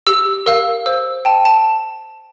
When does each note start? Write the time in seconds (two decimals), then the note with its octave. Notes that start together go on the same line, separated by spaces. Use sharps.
0.07 G4 E6
0.46 A#4 F5 E6
0.86 C5 E6
1.25 G5 A5
1.45 A5